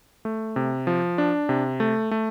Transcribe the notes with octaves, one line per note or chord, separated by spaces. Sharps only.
A3
C3
F3
D4
C3
A3
A3